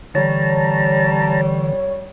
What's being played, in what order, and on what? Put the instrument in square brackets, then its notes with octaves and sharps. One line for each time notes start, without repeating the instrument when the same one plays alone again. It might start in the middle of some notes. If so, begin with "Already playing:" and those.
[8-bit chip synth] D3 E3 [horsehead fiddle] G3 [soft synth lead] C#5 [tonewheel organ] A5 A#5